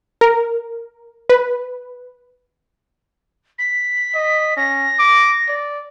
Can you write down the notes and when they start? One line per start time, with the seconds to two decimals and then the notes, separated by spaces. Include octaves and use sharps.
0.21 A#4
1.29 B4
3.59 B6
4.15 D#5
4.57 C#4 A#6
4.99 D6
5.48 D5